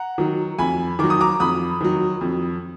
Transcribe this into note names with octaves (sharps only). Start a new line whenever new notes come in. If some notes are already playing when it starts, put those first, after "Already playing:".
Already playing: F#5 A#5
D#3 F#3
F2 G#5 B5
D#3 F#3 D6
D#6
A#5 D6
F2 B5 D#6
D#3 F#3
F2